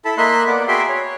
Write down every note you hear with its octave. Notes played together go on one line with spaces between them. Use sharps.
E4 A4 A5 B5
A#3 D#5 E5 B5 C6 F#6
A#3 B3 D5 F#5
F#4 G#4 E5 G5 B5 C6
C#5